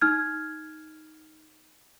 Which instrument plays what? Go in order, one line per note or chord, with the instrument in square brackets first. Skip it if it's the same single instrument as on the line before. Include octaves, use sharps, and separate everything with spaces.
[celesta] D#4 F6 G#6